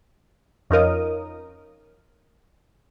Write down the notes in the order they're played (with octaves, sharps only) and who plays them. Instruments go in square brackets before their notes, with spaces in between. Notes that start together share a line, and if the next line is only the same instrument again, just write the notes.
[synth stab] F2 C#4 D#4 F4 A#4 D#6